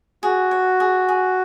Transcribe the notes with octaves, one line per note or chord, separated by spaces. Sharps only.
F#4 G#4
C#5
G#4
G#4